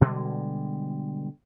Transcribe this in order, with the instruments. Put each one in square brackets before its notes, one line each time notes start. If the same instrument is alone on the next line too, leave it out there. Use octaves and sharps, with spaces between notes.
[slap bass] B2 D3 G3 G#3